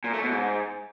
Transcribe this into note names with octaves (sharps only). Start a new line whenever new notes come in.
A#2
A3
B2
G#2